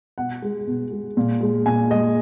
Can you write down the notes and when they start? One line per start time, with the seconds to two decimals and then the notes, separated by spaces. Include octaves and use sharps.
0.18 B2 F#5
0.42 G#3
0.67 B2
0.91 G#3
1.17 A#2
1.41 G#3
1.66 A#2 G#5
1.90 G#3 D#5